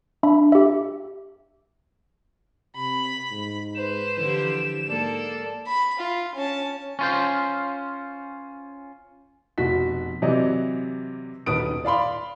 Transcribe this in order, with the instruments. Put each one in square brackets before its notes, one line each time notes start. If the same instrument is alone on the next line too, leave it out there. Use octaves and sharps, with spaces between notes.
[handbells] D4 E5 B5
G4 E5
[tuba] C3 [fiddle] B5
[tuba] G#2
[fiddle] B4 C5 [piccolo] E7
[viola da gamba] D3 F3 G4 [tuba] E3
[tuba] G#2 [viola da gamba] A#3 [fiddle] A4 D5
[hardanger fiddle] B5
F4
C#4 A5
[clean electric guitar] C#4 F4 C5
[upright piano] F1 B2 F#4 B6
C3 E3 F#3 D5 D#5
D#1 B1 B4 D#6 D7
D5 F5 B5 C6